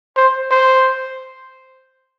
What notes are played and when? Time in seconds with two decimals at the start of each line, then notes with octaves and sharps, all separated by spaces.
0.17 C5
0.51 C5